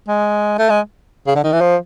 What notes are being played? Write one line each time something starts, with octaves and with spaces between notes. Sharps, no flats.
G#3
A3
G#3
C#3
D3
D#3
E3
F3